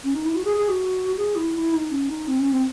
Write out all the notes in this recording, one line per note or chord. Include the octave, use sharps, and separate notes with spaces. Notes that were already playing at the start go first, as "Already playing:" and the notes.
C#4
D#4
E4
F#4
G#4
G#4
F#4
G#4
E4
E4
D#4
C#4
D#4
C4
C#4
C4